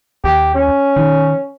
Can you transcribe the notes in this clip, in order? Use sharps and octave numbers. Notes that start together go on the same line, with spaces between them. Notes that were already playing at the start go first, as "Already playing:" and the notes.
D#2 G4
C#4
D#3